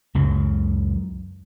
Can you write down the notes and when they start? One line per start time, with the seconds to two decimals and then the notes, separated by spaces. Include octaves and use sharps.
0.15 C#2 F#2 C#3 F#3